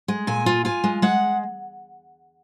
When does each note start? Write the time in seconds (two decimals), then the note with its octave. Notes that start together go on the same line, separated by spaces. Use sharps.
0.08 G#3
0.27 A#2 G#5
0.46 F4
0.65 F4 G#5
0.84 G#3
1.02 G#3 F#5